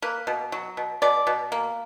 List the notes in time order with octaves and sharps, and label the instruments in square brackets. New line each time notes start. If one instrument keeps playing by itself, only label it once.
[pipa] A#3 B4
B2
F#3
B2
B2 D5
B2
A#3